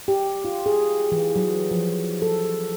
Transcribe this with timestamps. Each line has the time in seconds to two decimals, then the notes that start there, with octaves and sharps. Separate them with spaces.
0.08 G4
0.45 F4
0.66 G#4
1.12 E3
1.36 F#3
1.71 F3
2.22 A4